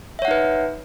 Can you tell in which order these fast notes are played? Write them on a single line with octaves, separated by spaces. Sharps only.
E5 C#5 F#5 D#4 B4